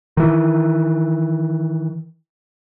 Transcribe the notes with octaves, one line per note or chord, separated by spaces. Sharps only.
D#3 E3